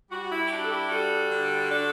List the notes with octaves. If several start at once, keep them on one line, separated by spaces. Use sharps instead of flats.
G3 F#4
E4
G4
D4 F#4
A4
E4 G4
G3 F#4 A4
D3
D4